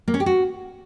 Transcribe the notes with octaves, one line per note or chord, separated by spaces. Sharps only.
A#3
C#4
G4
F#4